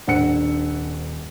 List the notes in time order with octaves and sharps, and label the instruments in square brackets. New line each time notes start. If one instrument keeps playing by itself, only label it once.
[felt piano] D#1 F#5 C#7 [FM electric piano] D4 C5 E6